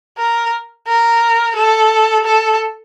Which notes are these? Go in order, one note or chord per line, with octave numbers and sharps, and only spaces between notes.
A#4
A#4
A4
A4